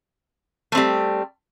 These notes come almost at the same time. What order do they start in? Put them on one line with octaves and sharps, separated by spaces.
A3 C4 G3